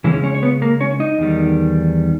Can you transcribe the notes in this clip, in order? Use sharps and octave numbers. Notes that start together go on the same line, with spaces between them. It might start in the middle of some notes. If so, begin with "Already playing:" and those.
C#3 E3 G#3 C#4 E4
C#4 C#5
C#5
B3 B4
A#3 A#4
C#4 C#5
D#4 D#5
E2 D#3 G3